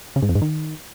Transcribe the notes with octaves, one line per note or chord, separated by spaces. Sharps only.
C#3
G#2
F2
G#2
D#3